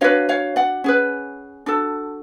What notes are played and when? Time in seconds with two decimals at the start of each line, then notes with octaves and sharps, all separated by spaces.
0.01 D4 F#4 B4 C#5 F5
0.29 C#5 F5
0.56 D5 F#5
0.84 C#4 G#4 B4
1.66 D4 F#4 A4